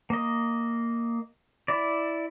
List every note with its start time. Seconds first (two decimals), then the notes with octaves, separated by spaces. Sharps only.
0.10 A#3 D#5
1.68 E4 D5